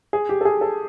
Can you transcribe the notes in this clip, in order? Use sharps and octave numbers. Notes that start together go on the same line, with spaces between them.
G#4
G4
A4
G#4
A4